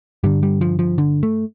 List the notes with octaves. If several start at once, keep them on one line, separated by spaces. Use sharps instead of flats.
G2 D3 G3
G3
F3
F3
D3
A3